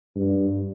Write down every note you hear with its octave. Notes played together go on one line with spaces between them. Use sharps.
G2